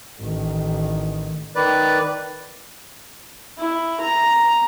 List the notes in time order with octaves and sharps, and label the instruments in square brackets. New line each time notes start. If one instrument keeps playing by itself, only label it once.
[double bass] A1 D#3
[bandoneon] D#3 B4 D5
[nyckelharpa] E4
A#5